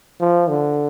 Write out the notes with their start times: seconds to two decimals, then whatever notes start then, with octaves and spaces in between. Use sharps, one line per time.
0.20 F3
0.49 D3